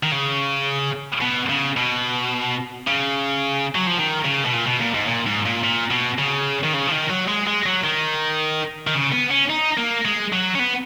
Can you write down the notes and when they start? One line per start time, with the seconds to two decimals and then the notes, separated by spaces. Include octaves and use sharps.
0.03 D#3
0.12 C#3
1.21 B2
1.49 C#3
1.77 B2
2.88 C#3
3.75 F#3
3.87 F3
3.98 D#3
4.25 C#3
4.45 B2
4.54 A#2
4.67 B2
4.81 A#2
4.94 G#2
5.08 A#2
5.26 G#2
5.45 A#2
5.63 A#2
5.91 B2
6.19 C#3
6.64 D#3
6.74 C#3
6.87 F3
6.92 D#3
7.10 F#3
7.28 G#3
7.47 G#3
7.66 F#3
7.84 D#3
8.87 D#3
8.95 C#3
9.12 B3
9.31 C#4
9.49 D#4
9.77 A#3
10.05 G#3
10.32 F#3
10.55 C#4
10.59 B3